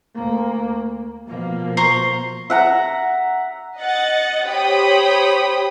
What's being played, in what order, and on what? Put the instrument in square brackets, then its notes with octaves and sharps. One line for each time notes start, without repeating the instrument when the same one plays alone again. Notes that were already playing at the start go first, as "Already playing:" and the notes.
[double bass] D2 A#3
[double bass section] B2 F3 A#3
[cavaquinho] C5 A#5 C#6
[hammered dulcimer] E5 F#5 A#5
[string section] D#5 F#5 A6
G4 C5 C#5 G5 B5 D#6